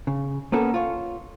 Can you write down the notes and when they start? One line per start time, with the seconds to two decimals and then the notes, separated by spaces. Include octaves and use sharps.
0.07 C#3
0.52 A#3 B3 C#4 A4
0.74 F4 C#5